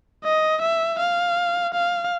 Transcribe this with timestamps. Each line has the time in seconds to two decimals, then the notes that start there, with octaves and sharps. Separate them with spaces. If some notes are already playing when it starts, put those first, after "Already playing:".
0.24 D#5
0.62 E5
0.99 F5
1.74 F5